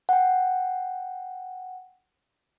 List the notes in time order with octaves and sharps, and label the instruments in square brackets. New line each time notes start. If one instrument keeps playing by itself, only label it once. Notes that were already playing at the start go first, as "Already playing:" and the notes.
[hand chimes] F#5 G5